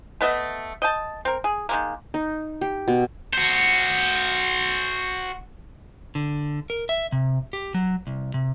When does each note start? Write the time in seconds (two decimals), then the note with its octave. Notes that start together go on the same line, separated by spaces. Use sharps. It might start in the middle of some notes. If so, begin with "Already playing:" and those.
0.21 A3 B3 D#5 E5
0.82 D#5 G5 A5
1.25 C4 A#4
1.44 G#4
1.69 D#3 G#3 A#3
2.14 D#4
2.61 G4
2.88 B2
3.33 F#4 C5
6.15 D3
6.70 A#4
6.89 E5
7.12 C3
7.53 G4
7.74 F#3
8.07 C2
8.34 C3